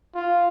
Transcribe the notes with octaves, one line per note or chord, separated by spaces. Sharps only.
F4